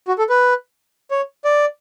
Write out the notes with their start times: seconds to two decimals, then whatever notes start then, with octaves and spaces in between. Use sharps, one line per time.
0.08 F#4
0.18 A4
0.29 B4
1.11 C#5
1.45 D5